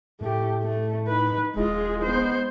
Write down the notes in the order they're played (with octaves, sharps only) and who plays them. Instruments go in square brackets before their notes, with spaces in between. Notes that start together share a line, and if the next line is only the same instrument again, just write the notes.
[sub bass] A2 [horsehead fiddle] A3 G4
[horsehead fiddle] A3
D#4 B4
[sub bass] D#1 [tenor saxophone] G#3 [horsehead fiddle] F4 G#4
[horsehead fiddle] B3 C5